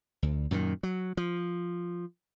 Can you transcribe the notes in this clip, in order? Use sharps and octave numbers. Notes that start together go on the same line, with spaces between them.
D2
F#2 A#2 D3 D#3
F#3
F3